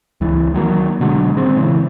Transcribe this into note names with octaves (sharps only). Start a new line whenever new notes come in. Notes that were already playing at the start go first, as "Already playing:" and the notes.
C#2 E3
D#3 F#3 A#3
B2 D3 F#3 G#3
A#2 D#3 G#3 C4
C#3 E3